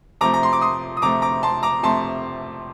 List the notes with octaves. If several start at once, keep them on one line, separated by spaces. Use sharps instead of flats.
C3 F3 A3 A#5 D6
A#5
C6
D6
C6 D#6
D#6
C3 F3 A3 A#5 D6
A#5 D6
A5 C6
A#5 D6
C3 F3 A3 A5 C6